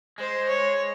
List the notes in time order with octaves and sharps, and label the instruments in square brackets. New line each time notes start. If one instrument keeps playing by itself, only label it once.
[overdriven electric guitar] G#3 [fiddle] C5
[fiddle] C#5